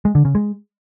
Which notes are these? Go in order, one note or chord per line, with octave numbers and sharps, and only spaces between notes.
G#3
D3
C#3
G#3